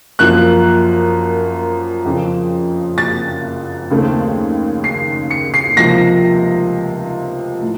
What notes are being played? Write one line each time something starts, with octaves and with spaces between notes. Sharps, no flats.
F#2 F3 A#3 F#6
F2 C#3 F3 C4
A6
D#2 C#3 A3 C4
C7
C#7
C7
C#2 C3 F3 A#3 A#6
A2